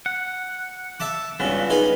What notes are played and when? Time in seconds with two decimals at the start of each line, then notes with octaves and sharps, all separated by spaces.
0.06 F#5
1.00 E5 A5 D6
1.40 G2 C#3 B3 F4 F#4
1.70 D#4 G#4 B4